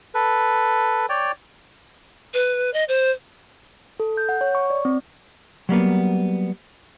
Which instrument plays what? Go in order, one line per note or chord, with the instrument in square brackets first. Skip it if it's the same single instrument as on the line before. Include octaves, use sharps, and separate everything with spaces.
[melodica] A4 B4
C#5 D5 G5
[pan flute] B4
D#5
C5
[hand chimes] A4
G6
F#5
C#5
C#6
D5
C4
[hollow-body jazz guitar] F#3 G3 A#3 B3